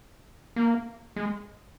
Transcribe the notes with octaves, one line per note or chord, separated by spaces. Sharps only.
A#3
G#3